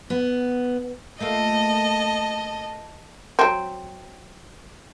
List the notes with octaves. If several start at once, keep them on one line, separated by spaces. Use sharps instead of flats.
B3
A3 A#3 F4 D#5 A5
F#3 C4